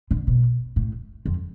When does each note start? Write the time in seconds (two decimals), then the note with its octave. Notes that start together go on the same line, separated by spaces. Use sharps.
0.11 D3
0.27 B2
0.76 A2
1.25 F2